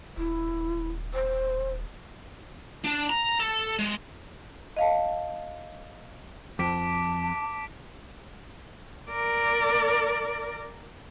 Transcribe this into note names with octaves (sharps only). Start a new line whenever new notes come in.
D#1 E4
C5
D4
A#5
A4
G#3
D#5 F5 A5
F2 A5 D6 B6 D7
A#4 D5